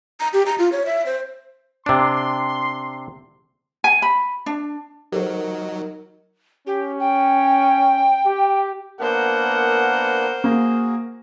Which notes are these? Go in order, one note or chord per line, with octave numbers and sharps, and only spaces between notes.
A#5
G4
A#5
F4
C#5
E5
C5
C3 D4 C6
G#5
B5
D4
F#3 D#4 G4 A4 A#4 C5
C#4 G4
G5
G4
A#3 B3 D4 A#4 C5 F#5
A#3 F#4 G#4